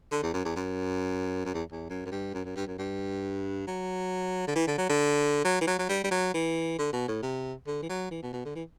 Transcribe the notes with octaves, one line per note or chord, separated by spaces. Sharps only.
D3
E2
F#2
E2
F#2
F#2
E2
E2
F#2
F#2
G2
F#2
F#2
G2
F#2
G2
F#3
D3
E3
D3
F#3
D3
F#3
E3
F#3
F#3
G3
G3
F#3
E3
D3
B2
A2
C3
D3
E3
F#3
E3
B2
B2
D3
E3